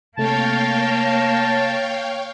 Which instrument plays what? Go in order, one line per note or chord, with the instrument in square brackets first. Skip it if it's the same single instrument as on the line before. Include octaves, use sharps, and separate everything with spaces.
[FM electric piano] C3 A3 [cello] A#3 [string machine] C#5 F5 G5 [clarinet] A5